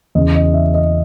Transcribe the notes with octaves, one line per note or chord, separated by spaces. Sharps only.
E2 C#3 E3 D#5
D#5
E5
D#5